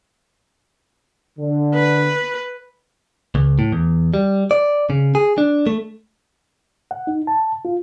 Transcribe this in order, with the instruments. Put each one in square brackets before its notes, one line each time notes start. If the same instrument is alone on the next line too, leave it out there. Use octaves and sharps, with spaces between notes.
[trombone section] D3
[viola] B4
[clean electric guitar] C#2
A2
E2
G3
D5
C#3
G#4
D4
A3
[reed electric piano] F#5
D#4
A5
F4